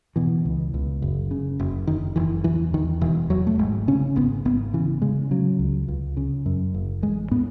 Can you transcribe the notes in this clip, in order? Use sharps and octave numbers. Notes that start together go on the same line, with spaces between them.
B2 E3
C#2
C#2
F#1
C#3
F#1
F#1 D#3
F#1 E3
E2 E3
E2 D#3
E1 E3
E1 F#3
A3
G#1 G#3
C#3 C#4
G#1 B3
G#1 B3
C#3 E3
C#3 G#3
C#3 F#3
C#2
C#2
C#3
F#2
F#1
A1 G#3
A2 B3